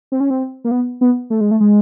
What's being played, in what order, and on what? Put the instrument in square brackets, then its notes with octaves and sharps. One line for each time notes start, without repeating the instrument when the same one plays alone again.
[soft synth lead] C4
C#4
C4
A#3
B3
B3
A3
G#3
A3
G#3